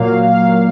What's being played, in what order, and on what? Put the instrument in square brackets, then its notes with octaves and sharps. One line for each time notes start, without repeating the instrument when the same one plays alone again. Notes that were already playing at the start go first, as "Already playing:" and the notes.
Already playing: [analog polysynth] A#2 F#3 A#3 F5
F5